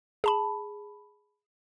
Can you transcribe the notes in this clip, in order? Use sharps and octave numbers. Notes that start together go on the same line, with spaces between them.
G#4 A5 B5